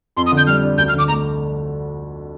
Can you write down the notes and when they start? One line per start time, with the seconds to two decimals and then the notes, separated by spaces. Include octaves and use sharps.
0.16 F2 C6
0.26 D#6
0.32 D3
0.37 G6
0.47 G3 F6
0.63 D4
0.78 D2 G6
0.88 F6
0.93 D3
0.99 D6
1.08 A3 A#5